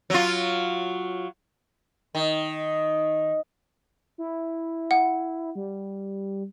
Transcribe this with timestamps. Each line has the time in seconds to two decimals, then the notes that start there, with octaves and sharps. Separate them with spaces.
0.10 F#3 F4
2.15 D#3
4.18 E4
4.91 F#5
5.55 G3